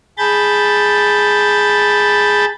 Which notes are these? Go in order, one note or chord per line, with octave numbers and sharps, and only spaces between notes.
G#4 A5 B5 G6 A6